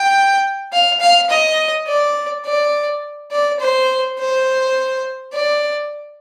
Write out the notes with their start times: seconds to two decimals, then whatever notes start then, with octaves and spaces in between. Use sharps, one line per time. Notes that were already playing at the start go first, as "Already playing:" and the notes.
Already playing: G5
0.72 F5
1.00 F5
1.30 D#5
1.87 D5
2.45 D5
3.32 D5
3.60 C5
4.19 C5
5.33 D5